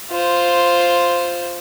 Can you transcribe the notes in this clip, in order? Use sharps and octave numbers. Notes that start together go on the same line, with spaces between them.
F4 C5